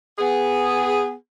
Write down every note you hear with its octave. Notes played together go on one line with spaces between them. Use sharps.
B3 G#4